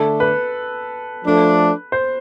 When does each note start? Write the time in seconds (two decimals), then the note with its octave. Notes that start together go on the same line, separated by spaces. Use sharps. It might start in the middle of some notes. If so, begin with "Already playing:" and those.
Already playing: D3 A3 D4 A4
0.20 B4
1.24 F3 A3 D4 A4
1.92 C5